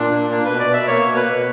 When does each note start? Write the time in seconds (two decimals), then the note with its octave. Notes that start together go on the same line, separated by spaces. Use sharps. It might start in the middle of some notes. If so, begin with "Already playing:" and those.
Already playing: A#2 D4
0.11 A#3
0.30 A#3 D4
0.45 B2 B4
0.59 D5
0.69 B2 E5
0.87 A#3 C#5
1.07 B2
1.16 B4
1.25 B2